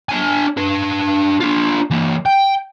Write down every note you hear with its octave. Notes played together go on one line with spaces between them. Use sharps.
D4 G#5
D4 B4
D4 F4
E3 A#3
G5